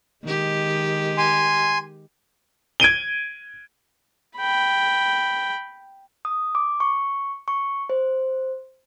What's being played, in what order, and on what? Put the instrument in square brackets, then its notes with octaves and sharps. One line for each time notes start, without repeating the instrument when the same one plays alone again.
[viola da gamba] D#3 G#3 G4
[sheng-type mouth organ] G#5 C6
[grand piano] G#6 D7 D#7 G7
[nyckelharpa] G5 B5
[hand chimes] D#6
D6
C#6
C#6
C5